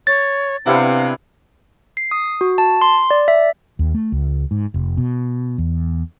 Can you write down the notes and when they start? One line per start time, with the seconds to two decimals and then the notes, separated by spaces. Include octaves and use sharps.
0.07 C#5 A6
0.66 C3 B3 D4 E4 F5
1.97 C7
2.11 D#6
2.41 F#4
2.58 A5
2.82 C6
3.11 D5
3.28 E5
3.79 D#2
3.94 A3
4.12 C#2
4.51 G#2
4.74 F1
4.97 B2
5.58 E2